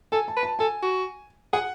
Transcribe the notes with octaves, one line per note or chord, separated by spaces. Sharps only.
A4 G#5
A5
B4
A5
A4 G#5
F#4
G#4 F#5